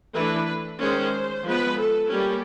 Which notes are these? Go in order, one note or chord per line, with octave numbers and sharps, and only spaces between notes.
E3 A3 D4 B4
D#3 G#3 C#4 C5
F3 G#3 B3 B4
A4
G3 A#3 C#4 G4